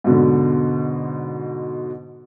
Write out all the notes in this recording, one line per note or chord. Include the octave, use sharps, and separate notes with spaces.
G#2 B2 D3